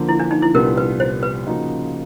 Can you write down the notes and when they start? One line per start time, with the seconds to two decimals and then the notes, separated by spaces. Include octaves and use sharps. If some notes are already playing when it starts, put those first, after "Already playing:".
Already playing: D3 F3 A#3
0.09 E4
0.20 D4
0.31 D#4
0.42 E4
0.54 C2 A#2 G3 B3 D4 A#4
0.77 B4
1.00 C5
1.23 B4
1.46 C#3 F3 A#3 D#4 F#4